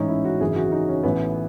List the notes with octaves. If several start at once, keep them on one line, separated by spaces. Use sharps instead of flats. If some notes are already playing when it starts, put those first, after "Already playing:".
Already playing: A1 G#2 E3 C#4 D#4
E4
F#4
G#1 F#2 C#3 E3 G#4
F#4
D#4
C#4
A1 A2 E3 B3